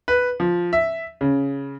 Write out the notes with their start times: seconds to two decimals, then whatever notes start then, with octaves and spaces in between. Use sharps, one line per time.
0.08 B4
0.40 F3
0.73 E5
1.21 C#3